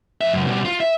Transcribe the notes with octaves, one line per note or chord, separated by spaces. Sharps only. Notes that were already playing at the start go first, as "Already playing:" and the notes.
F2 E5
C#2 F#2
B2 G3
F4
E5